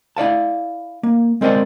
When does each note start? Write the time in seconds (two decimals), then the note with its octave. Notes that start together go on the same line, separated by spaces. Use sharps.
0.17 E4 D5 F5 A5
1.03 A#3
1.41 G#3 C4 A#4 C5 D5